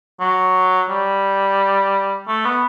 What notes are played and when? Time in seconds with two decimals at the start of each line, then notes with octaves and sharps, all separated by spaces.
0.20 F#3
0.90 G3
2.28 A3
2.45 B3